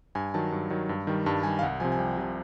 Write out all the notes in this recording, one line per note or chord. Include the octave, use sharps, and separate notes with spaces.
G2 G#5
D#3 F#3 A5
G2
D#3 F#3
G2
D#3 G3
G2 A5
D#3 G3 G#5
F5
C2 F#5
C3 F3 G#5
G#5
C2 G5
C3 F3